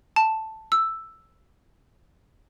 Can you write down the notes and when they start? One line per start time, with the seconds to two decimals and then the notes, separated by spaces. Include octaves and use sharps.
0.16 A5
0.72 E6